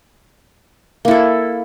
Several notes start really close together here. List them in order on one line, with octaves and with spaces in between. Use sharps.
A#3 E4 A4